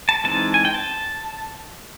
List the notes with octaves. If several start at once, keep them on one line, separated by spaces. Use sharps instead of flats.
A5
E3 G#3 C4 D#4 A5
G#5
G5
A5